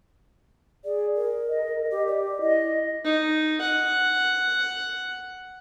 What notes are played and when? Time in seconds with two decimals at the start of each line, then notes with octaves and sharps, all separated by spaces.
0.84 G#4 D5
1.16 A#4
1.48 D#5
1.90 G4 D#5
2.07 D5
2.41 E4 D#5
3.04 D#4
3.61 F#5